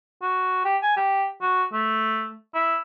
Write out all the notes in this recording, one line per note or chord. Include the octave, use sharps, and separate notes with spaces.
F#4
G4
G#5
G4
F#4
A3
E4